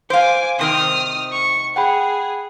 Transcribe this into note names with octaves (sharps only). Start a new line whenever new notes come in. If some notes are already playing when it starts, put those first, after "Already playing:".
C5 F5 G#5 D6
C3 D#3 C4 D#6 F6
C#6
G#4 F#5 G5 B5